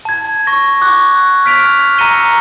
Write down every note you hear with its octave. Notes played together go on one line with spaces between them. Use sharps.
A5 G#6
C#6 A#6
C#6 D6 F#6
F6 B6 D7 F7
A#5 E6 A#6 C#7 D#7 G7